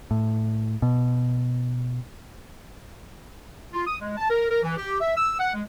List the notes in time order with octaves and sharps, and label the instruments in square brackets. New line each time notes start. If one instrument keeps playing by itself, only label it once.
[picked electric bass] A2
B2
[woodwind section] F4
D#6
G#3
A5
A#4
A#4
E3
G4
E5
E6
F#5
G#3